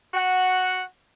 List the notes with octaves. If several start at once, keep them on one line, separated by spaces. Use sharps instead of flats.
F#4 F#5